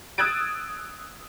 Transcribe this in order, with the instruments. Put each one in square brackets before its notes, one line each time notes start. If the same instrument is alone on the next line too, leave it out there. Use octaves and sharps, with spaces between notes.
[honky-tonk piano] D#6 E6 F#6 G#6 A6 D7